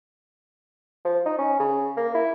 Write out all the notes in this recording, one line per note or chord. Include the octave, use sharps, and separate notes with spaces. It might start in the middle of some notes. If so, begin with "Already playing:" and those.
F3
D#4
C#4
C#3
A#3
E4